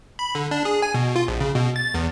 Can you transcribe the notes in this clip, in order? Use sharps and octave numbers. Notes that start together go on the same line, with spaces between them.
B5
D3
D4
G#4
G#5
B2
F4
A#1
C#3
B2
A6
E2